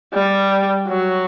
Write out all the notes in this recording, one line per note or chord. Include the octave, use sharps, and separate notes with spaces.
G3
F#3